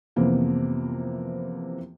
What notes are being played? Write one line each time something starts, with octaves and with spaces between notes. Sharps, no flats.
F2 C3 E3 A#3 B3